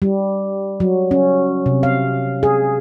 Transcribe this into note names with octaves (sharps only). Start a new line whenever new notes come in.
G3
F#3
C#4
C3
F5
G#4